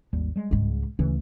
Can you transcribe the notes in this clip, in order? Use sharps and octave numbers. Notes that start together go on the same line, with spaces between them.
G#1 D#2 G3
G3 G#3
C#2 G#2
D2 C#3 E3 C#4